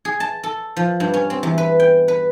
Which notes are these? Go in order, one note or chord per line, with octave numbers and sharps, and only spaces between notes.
G#4
A5
A4
F3
G2
C#4
C4
E2
B4
G5
B4